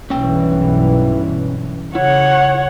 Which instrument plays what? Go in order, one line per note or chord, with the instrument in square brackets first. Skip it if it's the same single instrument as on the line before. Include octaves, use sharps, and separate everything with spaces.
[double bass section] B1 G2 E3 [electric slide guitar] C#4 G5
[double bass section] C#3 [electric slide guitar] E4 [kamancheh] C#5 F#5